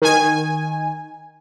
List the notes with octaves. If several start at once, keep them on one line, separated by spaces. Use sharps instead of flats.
D#3 G#5